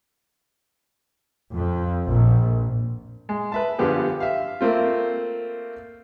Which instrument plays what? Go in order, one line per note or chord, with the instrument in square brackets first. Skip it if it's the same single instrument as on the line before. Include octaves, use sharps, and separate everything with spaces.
[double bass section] F2
A#1
[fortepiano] G#3
B4 E5 A5
G2 D3 F3 B3 G4 G#4
E5 F5
A3 A#3 C4 F4